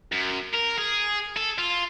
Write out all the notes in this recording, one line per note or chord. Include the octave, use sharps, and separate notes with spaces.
F#2
A#4
G#4
A4
F4